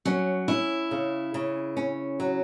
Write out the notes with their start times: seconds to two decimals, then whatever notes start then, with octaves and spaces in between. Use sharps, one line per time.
0.05 F#3 C#4
0.48 C#4 E4
0.91 C#3
1.34 C#3
1.77 C#4
2.20 F#3